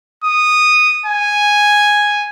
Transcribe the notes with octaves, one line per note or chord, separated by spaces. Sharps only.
D#6
G#5